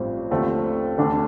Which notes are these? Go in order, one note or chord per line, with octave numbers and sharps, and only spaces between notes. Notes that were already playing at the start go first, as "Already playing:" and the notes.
Already playing: A1 G2 F3 C4
D#2 D3 F3 A3 C4
D2 D3 A3 D4 A4